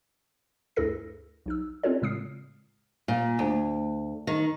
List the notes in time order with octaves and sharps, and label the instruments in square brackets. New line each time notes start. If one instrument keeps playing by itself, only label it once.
[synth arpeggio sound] D2 G2 E4 G#4 A4 A#6
B1 D#4 E6
C4 C#4 F4 A4 C#5
A2 C#3 G#3 D#6 F6 C7
[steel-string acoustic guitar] A#2
D2
D#3